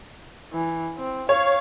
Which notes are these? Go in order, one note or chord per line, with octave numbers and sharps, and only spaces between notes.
E3
C4
C#5 F5